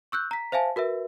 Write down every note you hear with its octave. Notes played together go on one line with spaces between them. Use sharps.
C#6 E6 F#6 G6
A#5 B6
C5 E5 F5 G#5 A5
F#4 A#4 B4 E5